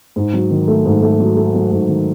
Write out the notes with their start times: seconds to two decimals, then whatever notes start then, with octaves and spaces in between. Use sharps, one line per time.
0.16 G#2
0.33 F#3
0.51 D#3
0.68 A3
0.85 G#2
1.03 A3
1.20 F#3
1.37 A3
1.54 F#3
1.72 G#2
1.89 D#3